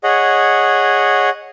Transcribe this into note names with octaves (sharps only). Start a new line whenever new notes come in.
G#4 C#5 D#5 F#5